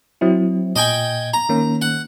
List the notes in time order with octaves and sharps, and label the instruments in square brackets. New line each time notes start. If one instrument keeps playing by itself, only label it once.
[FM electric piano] F#3 C4 E4
[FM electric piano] A#2 [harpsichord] D#5 G5 G#5
[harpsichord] A#5
[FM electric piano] D#3 A#3 C#4
[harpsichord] F#5